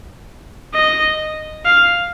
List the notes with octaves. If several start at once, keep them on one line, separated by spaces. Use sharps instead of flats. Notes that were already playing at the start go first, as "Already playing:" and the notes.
D#5
F5